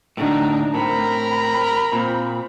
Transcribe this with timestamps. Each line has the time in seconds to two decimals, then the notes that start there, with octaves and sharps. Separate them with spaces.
0.17 D2 A2 D4 D#4
0.75 A2 C4 A#4 B5
1.93 A#2 C4